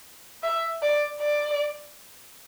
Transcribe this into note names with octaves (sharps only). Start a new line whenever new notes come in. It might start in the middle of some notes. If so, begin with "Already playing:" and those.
E5
D5
D5